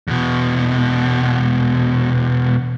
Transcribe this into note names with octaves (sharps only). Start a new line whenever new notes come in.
E2 B2